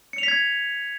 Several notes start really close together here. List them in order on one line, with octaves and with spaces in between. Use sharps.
C#7 F7 B6 G#6